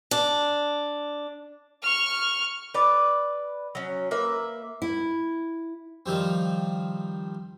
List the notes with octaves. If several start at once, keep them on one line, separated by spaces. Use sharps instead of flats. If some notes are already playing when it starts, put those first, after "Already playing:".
D4
C#6 F6
B4 D5
F#3 C#4
A#3 B4 E5
E4
D#3 F3 G3 C4